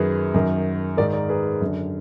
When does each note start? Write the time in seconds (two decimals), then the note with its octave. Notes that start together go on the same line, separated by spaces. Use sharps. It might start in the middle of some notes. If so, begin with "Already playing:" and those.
Already playing: F#2 D#3 G#4 B4
0.34 F#2 D#3
0.97 G#2 D#3 A#4 D5
1.13 A#4 D5
1.29 G#4 B4
1.61 F#2
1.66 D3